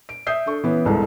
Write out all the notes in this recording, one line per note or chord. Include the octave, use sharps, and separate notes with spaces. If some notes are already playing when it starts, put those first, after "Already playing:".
D7
E5 D#6 G6 C7
D4 A4 C#6
E3 B3 C#4
G1 C2 G#2 G#3 A4 A#5